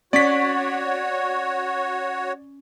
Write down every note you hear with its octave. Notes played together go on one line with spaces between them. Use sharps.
C#4 F#4 C#5 D5 B6